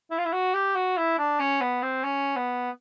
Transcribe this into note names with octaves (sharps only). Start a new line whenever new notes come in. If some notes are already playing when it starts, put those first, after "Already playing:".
E4
F4
E4
F#4
G4
F#4
E4
D4
C#4
B3
C4
C#4
B3